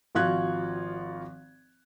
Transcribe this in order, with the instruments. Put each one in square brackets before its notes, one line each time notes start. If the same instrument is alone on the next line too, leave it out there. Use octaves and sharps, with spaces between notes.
[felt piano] G#1 F3 F4 F#4 F#6 G#6